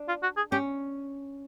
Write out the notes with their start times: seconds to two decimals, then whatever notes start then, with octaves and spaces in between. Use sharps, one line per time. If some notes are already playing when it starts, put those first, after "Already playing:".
Already playing: D4
0.08 F4
0.23 F#4
0.37 G#4
0.52 C#4 G4